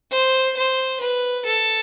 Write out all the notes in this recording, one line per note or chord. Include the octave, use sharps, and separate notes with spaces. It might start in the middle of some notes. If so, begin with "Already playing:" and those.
C5
C5
B4
A4